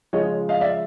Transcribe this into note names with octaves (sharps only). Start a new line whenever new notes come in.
C#3 F3 G#3 C#5 D#5
D#5 F5
D5 E5